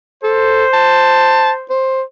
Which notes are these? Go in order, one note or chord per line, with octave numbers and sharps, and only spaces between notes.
A4 C5
A5
C5